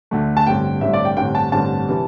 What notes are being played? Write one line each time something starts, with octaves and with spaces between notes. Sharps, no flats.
D2 D3 A3
A5
A1 G2 D3 C4 G5
A1 G2 D3 C4 E5
D5
G5
A1 G2 D3 C4 G5
A5
A1 G2 D3 C4 A5
C3 E3